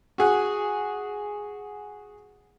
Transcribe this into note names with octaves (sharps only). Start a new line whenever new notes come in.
F#4 G#4 F#5